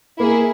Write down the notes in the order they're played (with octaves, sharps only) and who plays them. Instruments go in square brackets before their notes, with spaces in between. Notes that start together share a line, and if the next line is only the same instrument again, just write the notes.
[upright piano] A#3 [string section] E4 G#4